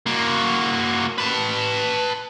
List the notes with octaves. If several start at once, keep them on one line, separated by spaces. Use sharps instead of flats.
A#3 F#4
B4 A5